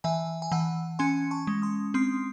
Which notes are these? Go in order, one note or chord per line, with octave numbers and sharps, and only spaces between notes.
E3 E5 G#5
G#5
E3 F#5 A5
C#4 G#5 C6
A5 C#6
G#3
C6 D#6
C4 C6 D#6